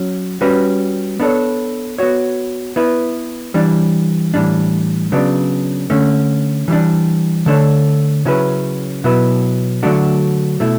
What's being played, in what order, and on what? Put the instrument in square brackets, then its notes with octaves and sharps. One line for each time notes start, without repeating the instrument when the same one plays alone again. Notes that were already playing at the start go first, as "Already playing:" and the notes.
Already playing: [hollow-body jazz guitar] F#3 C#4
G3 C#4 F#4 B4
B3 D4 A4 C#5
B3 F#4 C#5
B3 E4 B4
E3 G3 D4
A2 E3 G3 D4
C#3 F#3 B3 D4
D3 A3 C#4
E3 G3 D4
D3 A3 D4 A4 C#5
C#3 F#3 C#4 E4 B4
B2 F#3 B3 E4 B4
D3 F#3 A3 D4 F#4
B2 A3 E4